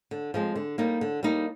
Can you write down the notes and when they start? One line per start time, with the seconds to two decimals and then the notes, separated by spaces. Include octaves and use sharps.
0.11 D3
0.34 F3 G#3 C4
0.55 D3
0.78 G3 A#3 D#4
1.01 D3
1.23 G3 A#3 D#4